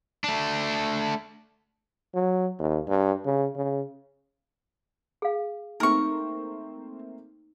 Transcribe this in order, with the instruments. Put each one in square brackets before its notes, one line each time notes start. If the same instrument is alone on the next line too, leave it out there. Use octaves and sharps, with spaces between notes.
[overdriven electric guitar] A3 D4
[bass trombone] F#3
D#2
G2
C#3
C#3
[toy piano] G#4 F5
[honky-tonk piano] A3 A#3 C4 [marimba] D#4 F6 [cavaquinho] A#4 C#6